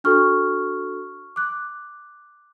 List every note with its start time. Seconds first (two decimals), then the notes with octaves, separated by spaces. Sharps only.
0.04 D4 F#4 A4 C#6 F6
1.36 D6 F#6